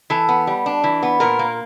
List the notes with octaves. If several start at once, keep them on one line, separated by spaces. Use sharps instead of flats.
E3 A4
B3
G3
D4
E3
B3
A#2 A#4
A#3